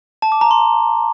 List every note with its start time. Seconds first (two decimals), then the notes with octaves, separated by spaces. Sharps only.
0.22 A5
0.32 D6
0.41 A#5
0.51 C6